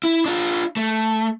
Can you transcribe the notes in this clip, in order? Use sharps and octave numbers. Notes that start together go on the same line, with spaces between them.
E4
D4 F4
A3